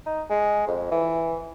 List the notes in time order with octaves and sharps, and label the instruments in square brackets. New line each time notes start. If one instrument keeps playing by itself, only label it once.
[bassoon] D#4
G#3
F2
E3